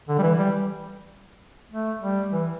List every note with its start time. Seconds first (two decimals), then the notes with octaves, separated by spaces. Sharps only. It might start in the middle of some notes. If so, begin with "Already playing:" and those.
0.08 D3
0.18 G3
0.22 E3
0.38 G3
1.72 A3
2.01 G3
2.32 E3